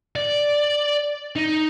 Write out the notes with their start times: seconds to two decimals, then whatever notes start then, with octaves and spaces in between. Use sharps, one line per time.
0.16 D5
1.36 D#4